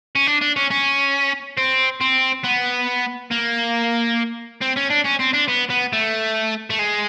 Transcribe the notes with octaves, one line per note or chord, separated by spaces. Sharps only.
C#4
D4
D4
C#4
C#4
C4
C4
B3
A#3
C4
C#4
D4
C#4
C4
D4
B3
B3
A3
A3
G#3